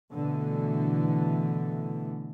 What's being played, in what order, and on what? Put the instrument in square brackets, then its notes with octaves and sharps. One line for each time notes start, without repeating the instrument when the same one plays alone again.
[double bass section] B2 D3 E3 A3